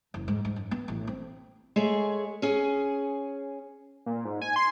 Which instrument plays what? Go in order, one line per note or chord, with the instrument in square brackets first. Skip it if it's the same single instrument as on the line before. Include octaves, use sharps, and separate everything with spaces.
[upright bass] F#1
G#2
G#2
F#2
B3
A1
C4
[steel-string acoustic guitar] G#3 A3 G#4 C#5
C#4 G#4
[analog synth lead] A#2
G#2
G#5
C6